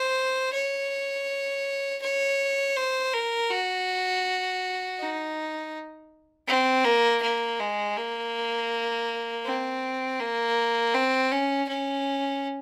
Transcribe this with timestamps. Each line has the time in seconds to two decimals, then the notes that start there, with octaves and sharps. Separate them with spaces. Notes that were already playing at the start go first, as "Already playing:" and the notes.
Already playing: C5
0.53 C#5
2.02 C#5
2.77 C5
3.13 A#4
3.50 F#4
5.00 D#4
6.48 C4
6.85 A#3
7.22 A#3
7.60 G#3
7.97 A#3
9.45 C4
10.20 A#3
10.94 C4
11.32 C#4
11.68 C#4